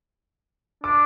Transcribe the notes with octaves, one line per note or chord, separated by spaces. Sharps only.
D4 D6